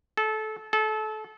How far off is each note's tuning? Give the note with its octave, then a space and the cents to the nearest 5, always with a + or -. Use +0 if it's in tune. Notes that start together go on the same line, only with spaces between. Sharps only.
A4 -25
A4 -30